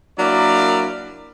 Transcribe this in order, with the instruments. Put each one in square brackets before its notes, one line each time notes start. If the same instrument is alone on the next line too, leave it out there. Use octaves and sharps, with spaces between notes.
[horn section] F#3 A#3 D4 E4 A#4 D5